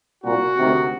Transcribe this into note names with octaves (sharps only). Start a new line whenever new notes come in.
C2 A#2 F#4
D2 C3 D#3